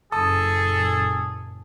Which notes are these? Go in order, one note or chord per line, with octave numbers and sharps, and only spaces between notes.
F#1 F#2 A#2 G#4 A4 A5 D#6